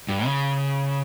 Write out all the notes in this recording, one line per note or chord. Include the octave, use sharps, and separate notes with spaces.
G2
C#3